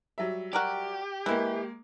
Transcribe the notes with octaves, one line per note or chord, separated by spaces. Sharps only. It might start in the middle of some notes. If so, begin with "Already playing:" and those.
F#3 G3 E5
F#4 G4 A#4 D5
E3 G#3 A#3 E4